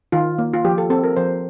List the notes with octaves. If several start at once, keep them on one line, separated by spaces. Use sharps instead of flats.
D#3 F4
A#3
F4
F3 G4
A4
C4 A4
A#4
F3 C5